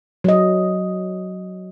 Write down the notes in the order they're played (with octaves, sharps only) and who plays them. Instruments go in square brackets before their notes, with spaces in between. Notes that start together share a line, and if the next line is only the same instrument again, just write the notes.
[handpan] F#3 D#5